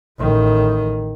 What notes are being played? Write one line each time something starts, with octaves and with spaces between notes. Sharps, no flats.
A1 D#3